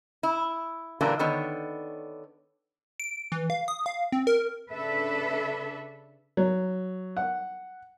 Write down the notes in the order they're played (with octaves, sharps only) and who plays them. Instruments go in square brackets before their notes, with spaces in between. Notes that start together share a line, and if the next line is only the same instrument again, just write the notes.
[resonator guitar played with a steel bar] E4
A#2 D3 E3 G3 A#3 D4
D3 D#3 B3 C#5
[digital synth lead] D7
E3
F5
D#6
F5
C4
A#4
[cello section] C#3 D4 A4 B4 E5
[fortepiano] F#3
F#5